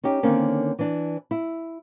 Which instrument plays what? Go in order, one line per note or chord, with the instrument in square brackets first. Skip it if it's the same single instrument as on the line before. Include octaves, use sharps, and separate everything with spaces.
[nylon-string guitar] C#4 D#4 G4
D3 D#3 A#3 C4 C#4
E3 D4
E4